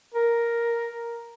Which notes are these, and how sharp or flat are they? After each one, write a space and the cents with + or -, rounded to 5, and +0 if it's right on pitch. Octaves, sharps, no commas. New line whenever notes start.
A#4 +5